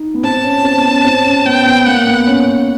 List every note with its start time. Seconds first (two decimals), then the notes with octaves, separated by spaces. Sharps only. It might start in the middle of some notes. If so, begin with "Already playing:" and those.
Already playing: D#4
0.14 B3
0.24 C4 A5
0.44 C#4
0.64 C4
0.77 B3
0.91 C#4
1.05 C4
1.26 C#4
1.45 B3 G5
1.66 B3
1.86 A#3 F#5
2.07 B3
2.27 C#4